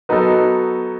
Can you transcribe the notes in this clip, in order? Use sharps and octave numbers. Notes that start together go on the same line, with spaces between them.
F#3 B3 D#4 F#4 A4